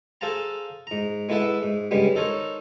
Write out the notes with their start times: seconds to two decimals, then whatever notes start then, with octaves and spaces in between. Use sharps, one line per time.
0.21 G#4 A4 C5 F5 A5 A#5
0.87 G#2 A#5
1.29 G#3 B3 E4 A4 E5 F#5
1.63 G#2
1.91 G2 C#3 G3 G#3 B3
2.15 D#4 A4 A#4 C5 C#5